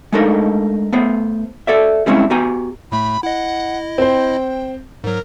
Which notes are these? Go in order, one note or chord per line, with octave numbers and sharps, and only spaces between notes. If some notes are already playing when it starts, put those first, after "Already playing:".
G#3 A3 D4 D#4 A4 A#4
A3 B3 C5
A4 D5 E5
G3 G#3 C4 C#4 E4
B3 F#4 G4 G#5 A#5
A2 A3 B5
E4 D#5 F#5
C4 C5 G5
G#2 F#3 A#4